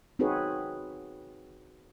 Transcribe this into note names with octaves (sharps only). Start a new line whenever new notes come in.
C4 D#4 F#4 G#4 B4 C#5